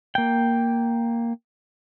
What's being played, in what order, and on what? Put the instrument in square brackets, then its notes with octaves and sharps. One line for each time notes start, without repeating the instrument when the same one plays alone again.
[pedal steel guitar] A#3 G5